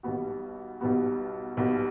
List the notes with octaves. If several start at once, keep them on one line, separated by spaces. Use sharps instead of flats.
B1 B2 G3 B3 F#4
B1 B2 G3 B3 F#4
B1 B2 G3 B3 F#4